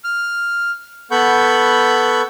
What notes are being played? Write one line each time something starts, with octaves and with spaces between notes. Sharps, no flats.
F6
B3 A4 F#5 B5 C#6 G6